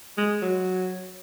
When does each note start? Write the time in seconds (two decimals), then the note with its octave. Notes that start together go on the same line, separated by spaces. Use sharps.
0.18 G#3
0.42 F#3